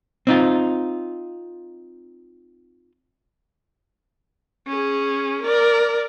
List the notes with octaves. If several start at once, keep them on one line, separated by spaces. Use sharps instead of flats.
C4 D#4 F4
C#4 G#4
A#4 D5